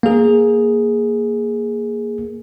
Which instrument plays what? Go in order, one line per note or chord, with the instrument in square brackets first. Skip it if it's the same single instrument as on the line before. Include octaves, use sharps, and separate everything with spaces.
[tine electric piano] A#3 G#4